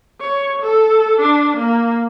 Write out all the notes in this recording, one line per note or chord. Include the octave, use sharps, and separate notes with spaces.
C#5
A4
D4
A#3